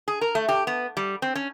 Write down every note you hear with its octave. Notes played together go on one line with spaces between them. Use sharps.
G#4
A#4
A3
G4
B3
G3
C4
C#4